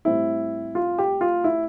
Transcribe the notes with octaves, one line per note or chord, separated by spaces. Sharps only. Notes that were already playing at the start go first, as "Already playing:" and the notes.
A2 G3 C4 E4
F4
G4
F4
E4